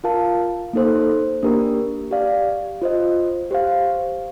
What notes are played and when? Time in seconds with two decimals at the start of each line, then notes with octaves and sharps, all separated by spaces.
0.04 F4 A#4 F5 A5
0.73 A#3 D#4 A4 C5
1.43 A#3 D4 G4 A#4
2.11 G4 D5 F5
2.82 F4 C5 D#5
3.51 G4 C5 F5